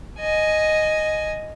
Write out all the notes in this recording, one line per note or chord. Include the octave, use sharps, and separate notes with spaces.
D#5 G#5